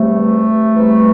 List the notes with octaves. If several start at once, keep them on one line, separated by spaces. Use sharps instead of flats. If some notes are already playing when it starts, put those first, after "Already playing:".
Already playing: E2 C3 E3 G3 A3
E2 C3 E3 G3